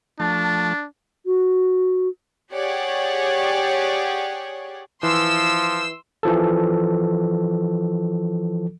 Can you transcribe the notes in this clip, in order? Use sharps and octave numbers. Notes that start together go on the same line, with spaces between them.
F3 A3 D4 A5
F#4
G4 G#4 C#5 D5 F#5
E3 F3 C6 E6
E3 F3 A4